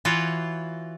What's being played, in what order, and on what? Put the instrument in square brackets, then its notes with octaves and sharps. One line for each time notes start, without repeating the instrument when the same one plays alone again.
[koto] E3 F4 F#4 C#5